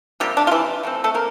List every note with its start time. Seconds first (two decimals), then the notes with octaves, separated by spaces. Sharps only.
0.20 C3 F3 G3 A#3 G4
0.37 D4
0.47 F4
0.51 E3 E4
0.83 E3 A3 C4
1.04 A3 A4
1.14 A#3 A#4